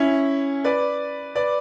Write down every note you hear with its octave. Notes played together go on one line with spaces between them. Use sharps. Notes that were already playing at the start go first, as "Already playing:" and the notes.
Already playing: C#4 E4
B4 D5
B4 D5